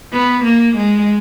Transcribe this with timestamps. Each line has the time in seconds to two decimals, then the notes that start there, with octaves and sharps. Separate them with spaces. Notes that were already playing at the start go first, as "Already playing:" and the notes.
0.13 B3
0.44 A#3
0.77 G#3